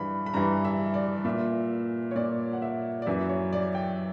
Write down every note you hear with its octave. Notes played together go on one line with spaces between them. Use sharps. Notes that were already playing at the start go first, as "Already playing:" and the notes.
Already playing: G2 E3 B5
B5
G2 E3 A#5
E5
D5
A#2 E5
C#5
A#2 D5
F#5
E5
D5
F#2 E3 E5
C#5
D5
G5